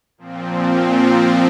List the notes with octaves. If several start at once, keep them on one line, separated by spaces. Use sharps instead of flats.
A#2 F3 C4